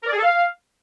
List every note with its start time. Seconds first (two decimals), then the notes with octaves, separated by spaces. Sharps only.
0.02 A#4
0.07 D5
0.12 G#4
0.18 A4
0.23 F5